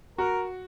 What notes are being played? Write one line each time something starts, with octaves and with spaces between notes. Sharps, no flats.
F#4 A#4